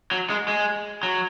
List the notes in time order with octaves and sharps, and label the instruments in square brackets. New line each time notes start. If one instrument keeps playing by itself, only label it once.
[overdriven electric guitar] F#3
G#3
G#3
F#3